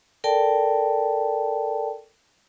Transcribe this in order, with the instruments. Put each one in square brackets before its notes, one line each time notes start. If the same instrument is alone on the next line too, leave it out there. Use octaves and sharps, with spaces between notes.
[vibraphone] A4 A#4 D5 G5 A5